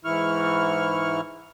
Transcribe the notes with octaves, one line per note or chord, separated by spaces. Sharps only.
G#2 E3 E4 C#6 F6